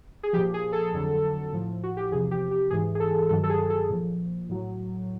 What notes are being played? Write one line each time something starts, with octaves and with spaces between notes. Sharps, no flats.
G#4
A#2 F3 G4
G#4
A4
F2 D3 F#3
A2 F3
F#4
G4
E2 C3 F3 G#4
G4
G4
G#2 E3 G#4
G#4
A4
G2 D#3 F#3 A4
A4
G#4
A4
A#2 F3
A2 F#3